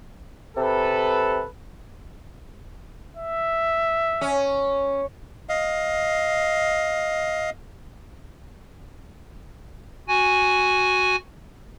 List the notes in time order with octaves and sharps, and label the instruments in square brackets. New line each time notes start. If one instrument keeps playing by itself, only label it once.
[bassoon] C3 [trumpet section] A4 B4
[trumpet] E5
[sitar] C#4
[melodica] D#5 F5
[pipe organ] F#4 G#5